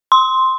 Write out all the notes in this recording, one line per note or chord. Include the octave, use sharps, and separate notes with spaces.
C6